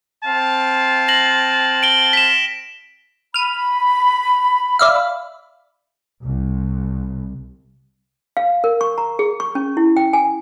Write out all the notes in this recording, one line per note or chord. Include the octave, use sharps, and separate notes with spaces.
C4 F5 A5
A#6 F#7
D7 G7
B6 E7
B5 F6 D#7
D5 E5 F5
C2
F5
A#4
C#6
A#5
G#4
C#6
C#4
E4
G5
G#5